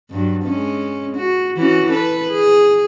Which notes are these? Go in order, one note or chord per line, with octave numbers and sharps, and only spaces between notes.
G2 F#3
G#3 C#4
F#4
E3 C#4 F#4
A4 B4
G#4